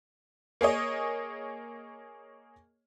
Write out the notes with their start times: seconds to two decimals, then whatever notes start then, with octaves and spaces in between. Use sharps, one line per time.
0.61 A#3 G#4 C#5 D#5